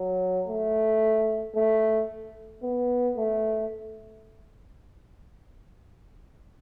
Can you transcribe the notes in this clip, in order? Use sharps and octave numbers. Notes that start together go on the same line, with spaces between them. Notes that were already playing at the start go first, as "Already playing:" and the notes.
Already playing: F#3
A3
A3
B3
A3